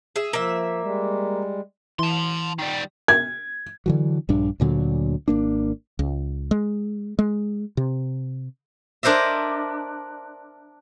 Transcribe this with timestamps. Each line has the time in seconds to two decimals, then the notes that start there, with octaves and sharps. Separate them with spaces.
0.16 G#4 E5
0.33 F3 A#3 E5
0.82 G3 G#3
1.99 E3 A5 C6
2.58 D#3 G3
3.08 G#6
3.86 D3 E3 F#3
4.29 A#1 G2 D4
4.60 D2 A#2 D3 F#3
5.28 G#1 A#3 D4
5.99 C#2
6.51 G#3
7.19 G#3
7.77 C3
9.03 D4 A#4 C5 D#5 E5